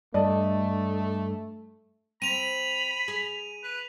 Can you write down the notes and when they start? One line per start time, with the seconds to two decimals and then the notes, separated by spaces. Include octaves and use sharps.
0.14 G2 A3 D5 D#5 A5
2.22 C4 B5 D#7 F7
3.08 G#4
3.63 B4